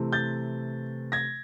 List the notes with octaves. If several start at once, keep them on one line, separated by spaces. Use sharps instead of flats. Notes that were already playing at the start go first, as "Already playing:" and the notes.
Already playing: C3 E3 A3 C4
G6 A6
G#6 A#6